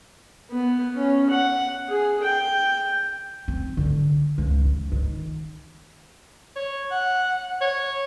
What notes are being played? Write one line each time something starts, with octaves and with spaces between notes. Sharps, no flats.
B3
C#4
F#5
G#4
G5
C4
D3
C#2
E3
D#3
C#5
F#5
C#5